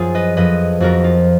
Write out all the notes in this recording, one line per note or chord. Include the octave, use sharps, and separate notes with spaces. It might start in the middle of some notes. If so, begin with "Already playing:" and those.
Already playing: F#2 F3 F4 G#4
B4 D#5
F2 F3 B4 D#5
F2 F3 F#4 A#4
F4